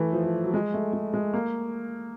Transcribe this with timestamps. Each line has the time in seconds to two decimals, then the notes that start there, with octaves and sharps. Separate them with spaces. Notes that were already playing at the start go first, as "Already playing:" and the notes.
Already playing: E3 A3
0.13 F3
0.24 F3
0.44 F#3
0.53 G#3
0.74 A3
0.93 G#3
1.14 G#3
1.34 A#3